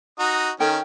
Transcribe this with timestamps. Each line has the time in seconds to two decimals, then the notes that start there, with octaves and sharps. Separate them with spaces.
0.19 D#4 F#4 D#6
0.60 D#3 C#4 A4 G5